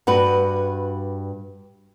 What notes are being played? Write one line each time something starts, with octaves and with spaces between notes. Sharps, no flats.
G2 F#4 B4